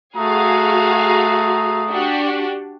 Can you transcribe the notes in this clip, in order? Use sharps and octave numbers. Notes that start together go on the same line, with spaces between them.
A3 F#4 G#4 F5 A#5 D#6
D4 F#4 G4